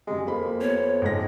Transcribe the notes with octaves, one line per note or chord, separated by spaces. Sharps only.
F#2 G3 G#3
F2 A#3 B5
B3 C#5
F#1 G#2 A#6